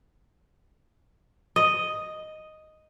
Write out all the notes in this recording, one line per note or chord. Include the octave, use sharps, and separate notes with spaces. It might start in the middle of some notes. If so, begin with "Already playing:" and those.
D#5